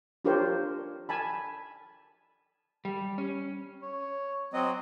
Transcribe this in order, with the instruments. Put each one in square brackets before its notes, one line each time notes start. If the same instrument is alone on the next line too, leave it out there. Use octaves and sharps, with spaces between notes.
[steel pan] D4 F4 G4 A#4 C5 C#5
G#5 A5 B5
[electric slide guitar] G3
C#4
[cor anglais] C#5
[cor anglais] F#3 [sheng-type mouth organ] C4 D#5